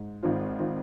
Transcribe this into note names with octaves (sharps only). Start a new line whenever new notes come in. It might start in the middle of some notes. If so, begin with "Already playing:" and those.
Already playing: G#2
G#1 G#2 D#3 C4 F4
D#3 C4 F4